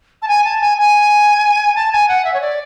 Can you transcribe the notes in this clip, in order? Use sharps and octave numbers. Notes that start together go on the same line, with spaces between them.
A5
G#5
A5
G#5
G#5
A5
G#5
F#5
E5
C#5
D5